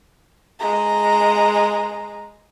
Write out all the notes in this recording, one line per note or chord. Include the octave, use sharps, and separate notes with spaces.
G#3 A#5